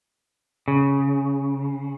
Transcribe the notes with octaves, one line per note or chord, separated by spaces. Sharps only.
C#3